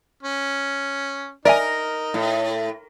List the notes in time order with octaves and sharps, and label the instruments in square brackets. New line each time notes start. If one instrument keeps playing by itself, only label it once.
[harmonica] C#4
[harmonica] D#4 [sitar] A#4 [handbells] D5 E5 G#5
[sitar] A2